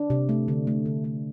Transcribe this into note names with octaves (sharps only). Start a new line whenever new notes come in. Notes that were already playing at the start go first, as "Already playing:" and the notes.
Already playing: D4
C3
A3
D3
A3
D3
A3